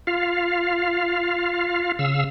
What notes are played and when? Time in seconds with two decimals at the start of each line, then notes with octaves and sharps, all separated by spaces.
0.07 F4 F5
1.99 C#3 F5 E6